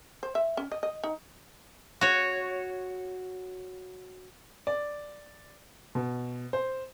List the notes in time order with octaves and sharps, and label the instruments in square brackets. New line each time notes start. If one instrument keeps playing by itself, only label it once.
[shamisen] C5
E5
C#4
D#5
D#5
D#4
[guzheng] F#4 C#5
[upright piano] D5
B2
C5